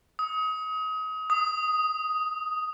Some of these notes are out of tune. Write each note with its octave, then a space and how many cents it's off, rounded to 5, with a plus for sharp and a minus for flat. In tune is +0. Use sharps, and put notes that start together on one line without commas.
D#6 +30
D#6 +5